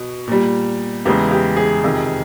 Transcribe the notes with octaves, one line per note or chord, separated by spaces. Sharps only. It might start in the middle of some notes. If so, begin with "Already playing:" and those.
Already playing: B2
A#2 G3
E2 C#3 E3 G#3 G4
G4
G#4
F2 C3 D#3